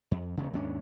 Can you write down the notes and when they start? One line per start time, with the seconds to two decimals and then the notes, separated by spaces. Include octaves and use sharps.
0.11 F2
0.37 E1 D2 C#3
0.53 D#2 G#2 C#4 D4